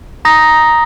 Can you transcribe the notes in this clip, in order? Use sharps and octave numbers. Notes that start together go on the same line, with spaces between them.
A#5 D#6 A#6